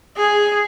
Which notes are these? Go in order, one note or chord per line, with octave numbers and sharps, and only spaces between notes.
G#4